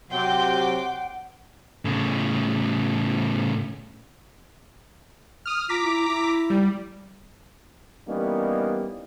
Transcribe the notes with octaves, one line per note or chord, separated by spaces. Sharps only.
C3 F#3 F#5 G5 C6 D6
A2 C#3
D#6 F6
F4 A#5 D6 B6
E4
E4
G3
E3 G3 A#3 B3 C#4 D#4